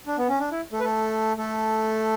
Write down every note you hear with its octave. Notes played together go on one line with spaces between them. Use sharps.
D4
B3
C#4
D4
E4
A3 A4
B4
A3 A4
A3 A4